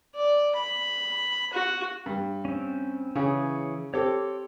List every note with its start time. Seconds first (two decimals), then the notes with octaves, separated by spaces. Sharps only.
0.15 D5
0.55 B5
1.53 F#4
2.06 G2
2.45 C4 C#4
3.16 C#3 E3 G#4 C#5
3.94 C4 G4 A4 C#5 D6